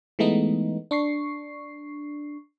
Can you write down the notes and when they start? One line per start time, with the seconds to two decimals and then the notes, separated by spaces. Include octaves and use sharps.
0.19 E3 G#3 A3 B3 D#4
0.91 D4 C#6 C7